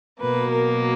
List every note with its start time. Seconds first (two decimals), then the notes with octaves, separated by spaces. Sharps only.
0.20 B2 F#3 A#3 B4
0.51 A#4